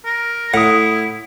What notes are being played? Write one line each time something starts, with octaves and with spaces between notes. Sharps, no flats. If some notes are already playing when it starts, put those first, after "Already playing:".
A#4
A2 E4 F#5 D#6